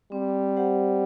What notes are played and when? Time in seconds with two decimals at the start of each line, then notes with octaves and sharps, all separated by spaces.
0.12 G3 C4
0.57 G4 C5 F#5